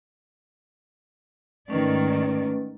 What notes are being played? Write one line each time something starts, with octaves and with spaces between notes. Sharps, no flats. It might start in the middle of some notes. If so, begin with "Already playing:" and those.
G#2 D#3 A3 C#4 B4 D5